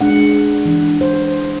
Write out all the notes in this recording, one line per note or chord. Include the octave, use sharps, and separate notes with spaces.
G#3 D4 F#5
E3 D4
C5